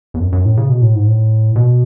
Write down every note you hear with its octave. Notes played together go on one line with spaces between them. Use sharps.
E2
F#2
F#2
A2
C#3
B2
A2
G#2
A2
B2